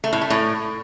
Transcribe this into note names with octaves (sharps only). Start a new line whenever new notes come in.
A3
A2
A3
A2